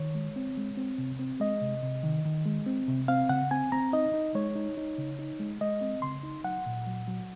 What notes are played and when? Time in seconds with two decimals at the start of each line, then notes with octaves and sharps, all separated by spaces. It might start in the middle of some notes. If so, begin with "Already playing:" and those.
Already playing: D#3 C#5
0.15 G#3
0.36 C4
0.57 G#3
0.77 C4
0.98 C3
1.19 C4
1.40 G#3 D#5
1.61 C3
1.83 C3
2.03 D#3
2.25 D#3
2.46 G#3
2.66 C4
2.88 C3
3.08 C4 F5
3.29 C#3 F#5
3.51 C4 G#5
3.72 C4 A#5
3.93 D#4 D#5
4.14 D#4
4.35 G#3 C#5
4.55 D#4
4.77 D#4
4.98 C#3
5.19 D#4
5.40 G#3
5.61 G#3 D#5
5.81 C4
6.02 C#3 C6
6.23 D#4
6.44 F#3 F#5
6.66 A#2
6.87 F#3
7.08 F#3